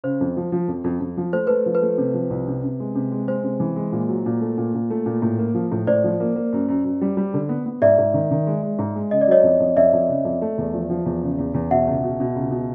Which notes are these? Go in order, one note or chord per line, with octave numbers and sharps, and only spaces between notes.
C#3 C5
F2
F3
F3
F2
F2
F2
F3
A3 C5
A3 B4
F3
B4
A3
C3
F3
C2
C3
C3
G#3
C3
G#3
G#3 C5
C3
E3
G#3
A#2
F#3
A#2
A3
A#2
A#2
A3
A#2
A2
A#3
F3
A2
A2 C5 D5
F3
A#3
A#3
F#2
F#2
F#2
G3
G3
D3
B3
B3
G#2 D5 E5
G#2
D#3
D#3
G#3
G#3
G#2
G#3
C#3 D#5
D5
F#3 C#5 D#5
F2
F2
F2 D5 E5
F2
C#3
F2
A3
E2
F3
F3
E2
C#3
E2
E2
B2 E5 F#5
C#2
B2
B2
C#2
B2